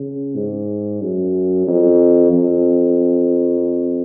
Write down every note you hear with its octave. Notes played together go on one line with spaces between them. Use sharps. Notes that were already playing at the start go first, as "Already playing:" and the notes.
Already playing: C#3
G#2
F#2
F2
F2